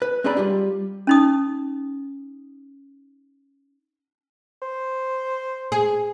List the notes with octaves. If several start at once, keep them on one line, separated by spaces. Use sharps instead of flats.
B4
C4 D4 D#4 G#4 D5 B5
G3 F4 G4
C#4 D#4 D#6
C5
G#4